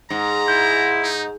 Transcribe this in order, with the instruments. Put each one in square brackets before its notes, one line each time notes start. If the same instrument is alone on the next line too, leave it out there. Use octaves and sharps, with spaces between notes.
[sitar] G#2 [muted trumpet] A#5
[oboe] E4 [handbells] G6
[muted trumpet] D#4